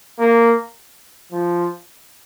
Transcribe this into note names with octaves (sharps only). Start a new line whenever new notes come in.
A#3
F3